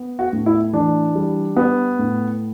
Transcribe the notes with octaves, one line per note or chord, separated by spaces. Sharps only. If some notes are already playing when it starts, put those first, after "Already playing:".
Already playing: B3
F#4
A2
E4
E3 D4
G3
B3
A2